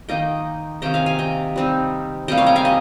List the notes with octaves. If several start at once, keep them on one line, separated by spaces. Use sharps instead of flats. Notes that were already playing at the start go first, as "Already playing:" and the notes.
D#3 A#3 D#4 D#5 G5
C3 D#3 A#3 C#4 D#5 G5
F5 G#5
F5 G#5
D#5 G5
G3 C4 D#4
C3 G3 A#3 D#5 G5
C#5 F5
D#5 G5
F5 G#5
D#5